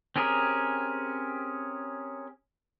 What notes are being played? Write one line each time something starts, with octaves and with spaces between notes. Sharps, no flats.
C4 C#4 G4 G#4 A#4